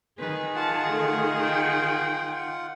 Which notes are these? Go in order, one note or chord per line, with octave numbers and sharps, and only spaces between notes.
D#3 G#4 B4
F4 F#5 A5
A3
G5